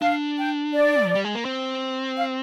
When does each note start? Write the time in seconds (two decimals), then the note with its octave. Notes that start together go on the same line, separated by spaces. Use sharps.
0.02 D4 F5
0.38 G5
0.74 D5
1.04 F3
1.15 G3
1.24 G#3
1.35 A#3
1.45 C4
2.17 F5